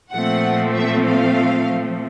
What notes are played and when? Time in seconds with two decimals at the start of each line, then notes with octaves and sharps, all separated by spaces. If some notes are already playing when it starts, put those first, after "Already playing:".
0.12 A#2 F3 A3 C4 F#5
0.74 E5
1.05 F5